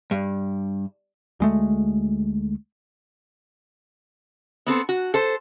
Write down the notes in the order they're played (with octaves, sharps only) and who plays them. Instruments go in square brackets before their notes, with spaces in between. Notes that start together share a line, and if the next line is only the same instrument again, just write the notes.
[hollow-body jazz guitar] G2
[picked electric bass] D2 G#3 A3
[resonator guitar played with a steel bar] B3 C4 A4
F#4
A4 C5